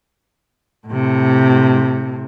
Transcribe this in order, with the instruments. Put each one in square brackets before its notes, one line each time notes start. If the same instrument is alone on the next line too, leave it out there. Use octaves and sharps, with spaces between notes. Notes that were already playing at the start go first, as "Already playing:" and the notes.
[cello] A2 C3